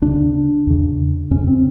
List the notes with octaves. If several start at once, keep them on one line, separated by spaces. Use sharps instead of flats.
D2 C#3 D4
E2 C#3
F2 C#3 C#4
C4